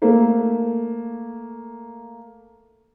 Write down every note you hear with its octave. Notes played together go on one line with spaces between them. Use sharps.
A3 A#3